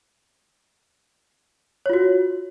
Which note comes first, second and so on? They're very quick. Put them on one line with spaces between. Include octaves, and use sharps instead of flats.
C#5 F4 F#4